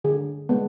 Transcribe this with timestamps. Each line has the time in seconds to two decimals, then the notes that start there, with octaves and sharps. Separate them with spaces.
0.04 D3 G#4
0.49 G#3 B3